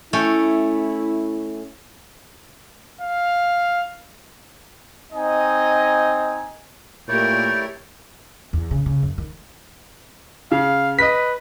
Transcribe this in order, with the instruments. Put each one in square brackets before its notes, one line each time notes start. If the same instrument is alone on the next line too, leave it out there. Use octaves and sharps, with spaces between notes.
[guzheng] A3 C#4 G5 [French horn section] E4
[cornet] F5
[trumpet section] C4 D#4 D#5 G#5
[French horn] A#2 [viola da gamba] A3 G4 A#4 [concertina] E4 C#5 D5 [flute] G6
[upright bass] E2
C#3
C#3
F#2
D#3
[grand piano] C#3 [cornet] F5
[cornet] B4 [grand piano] D#5 B6